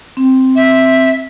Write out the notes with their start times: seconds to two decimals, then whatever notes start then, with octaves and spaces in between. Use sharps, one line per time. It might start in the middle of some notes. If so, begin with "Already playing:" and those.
0.17 C4
0.55 E5